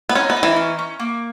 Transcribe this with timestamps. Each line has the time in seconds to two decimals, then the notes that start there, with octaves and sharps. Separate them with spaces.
0.09 B3
0.15 C#4 D#4
0.30 B3
0.36 D#4
0.43 E3
0.56 C#4
0.79 C#4
1.00 A#3